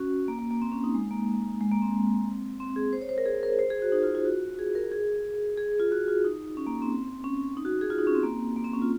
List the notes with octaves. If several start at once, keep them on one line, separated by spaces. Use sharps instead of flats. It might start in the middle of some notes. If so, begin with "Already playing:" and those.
Already playing: C#4 F#4
A#3
A#3
A#3
C4
C#4
D#4
G#3
A#3
G#3
A#3
C4
C4
G#4
C5
C#5
C5
A#4
G#4
A#4
C5
G#4
F#4
D#4
F#4
F4
F4
F#4
G#4
A#4
G#4
G#4
F4
F#4
F4
D#4
C#4
A#3
C4
C#4
D#4
F#4
G#4
F4
D#4
C#4
C4
A#3
A#3
C4
C#4
F4